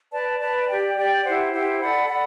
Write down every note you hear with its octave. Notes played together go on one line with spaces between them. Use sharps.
B4 D5 A5
B4 D5 A5
G4 D5 G5
G4 D5 G5
E4 G4 C5 F#5
E4 G4 C5 F#5
A4 D5 F#5 B5
A4 D5 F#5 B5